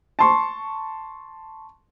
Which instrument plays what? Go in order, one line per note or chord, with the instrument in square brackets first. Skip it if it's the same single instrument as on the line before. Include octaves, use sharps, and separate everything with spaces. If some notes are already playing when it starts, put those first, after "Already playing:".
[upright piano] A5 C6 C#6